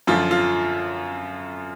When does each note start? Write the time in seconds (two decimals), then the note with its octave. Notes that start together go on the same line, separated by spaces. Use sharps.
0.07 F#2 D3 F3 F4
0.31 F4